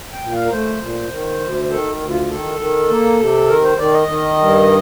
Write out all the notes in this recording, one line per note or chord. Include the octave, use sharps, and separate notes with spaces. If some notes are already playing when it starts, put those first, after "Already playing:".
G5
A#2
F5
A#4
A3 C5
A#2
D#3
D2
D#3 A4
D2
F4
D#3 A4
D#3
A#3
C3
D#3 A#4
C5
D#3 D5
D#5
D#3
G2